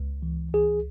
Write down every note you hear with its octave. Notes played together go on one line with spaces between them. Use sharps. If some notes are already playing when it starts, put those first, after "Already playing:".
Already playing: C#2
E3
C#2 G#4